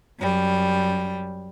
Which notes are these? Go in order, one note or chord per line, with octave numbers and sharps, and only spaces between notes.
F#2 G3